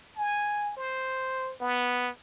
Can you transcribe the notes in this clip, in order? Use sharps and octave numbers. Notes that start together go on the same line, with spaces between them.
G#5
C5
B3